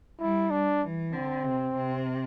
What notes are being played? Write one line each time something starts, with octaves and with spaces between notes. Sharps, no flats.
G3 E4
D4
E3
D3 C4
C3
C3